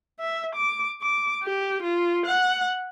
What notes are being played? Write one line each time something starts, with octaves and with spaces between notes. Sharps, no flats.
E5
D6
D6
G4
F4
F#5